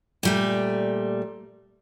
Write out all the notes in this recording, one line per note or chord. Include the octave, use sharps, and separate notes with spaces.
A#2 G3 A3